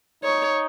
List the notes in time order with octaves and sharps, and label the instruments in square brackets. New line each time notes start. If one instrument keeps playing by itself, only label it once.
[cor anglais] D#4 [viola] C#5